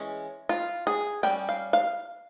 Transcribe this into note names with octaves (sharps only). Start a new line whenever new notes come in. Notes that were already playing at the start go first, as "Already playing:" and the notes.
Already playing: E3 G#3 C#4
F4
G#4
G3 C#4 G5
F5
F5